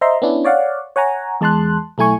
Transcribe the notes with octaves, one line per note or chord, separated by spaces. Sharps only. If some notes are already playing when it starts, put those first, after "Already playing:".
C5 D#5 E5 A#5 C6
B3 C#4 D4 E4
C#5 D5 F5 F#5
C#5 F#5 G#5 A#5
E2 G#3 A5 C6 F#6
B1 A3 E4 G#5 C#6